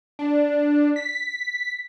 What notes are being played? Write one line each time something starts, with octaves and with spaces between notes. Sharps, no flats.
D4
B6